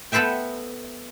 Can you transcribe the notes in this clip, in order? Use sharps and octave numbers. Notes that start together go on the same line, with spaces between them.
B3 A4 B4 C5 E5 G5